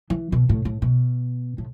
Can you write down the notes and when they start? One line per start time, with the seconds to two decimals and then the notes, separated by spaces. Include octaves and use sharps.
0.10 E3
0.32 B2
0.49 A2
0.65 A2
0.82 B2
1.58 A2